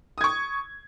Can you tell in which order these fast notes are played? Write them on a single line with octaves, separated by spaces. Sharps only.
D#6 G#6 C#6